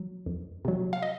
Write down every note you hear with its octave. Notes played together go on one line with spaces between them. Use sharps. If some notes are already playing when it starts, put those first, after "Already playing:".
Already playing: F#3
F2
C3 F#3
F5
D#5